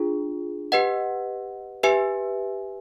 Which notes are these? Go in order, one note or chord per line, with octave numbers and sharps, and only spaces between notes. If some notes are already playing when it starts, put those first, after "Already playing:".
Already playing: D4 F4 G#4
G4 B4 D#5 F#5
G4 B4 E5 G#5